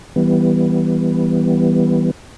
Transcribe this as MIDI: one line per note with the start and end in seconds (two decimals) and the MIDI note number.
0.16 2.11 52
0.16 2.11 55
0.16 2.11 59